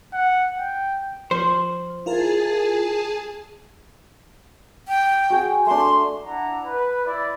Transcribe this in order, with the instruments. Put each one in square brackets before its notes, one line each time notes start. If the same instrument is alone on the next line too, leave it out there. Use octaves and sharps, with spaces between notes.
[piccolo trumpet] F#5
G5
[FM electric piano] F3 [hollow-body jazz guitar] C5
[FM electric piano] E4 F4 A#4 [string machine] G#4 G#5 A5
[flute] G5
[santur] F#4 G#4
[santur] A3 D4 [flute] C6
[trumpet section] D4 E4 F#5 A#5
B4
E4 D5